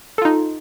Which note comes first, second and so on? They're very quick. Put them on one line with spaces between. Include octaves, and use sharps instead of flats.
A4 F4 D#4